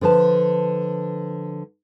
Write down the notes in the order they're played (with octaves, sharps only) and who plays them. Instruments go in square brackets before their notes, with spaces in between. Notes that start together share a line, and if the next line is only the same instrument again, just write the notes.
[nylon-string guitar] D3 F3 B4 A5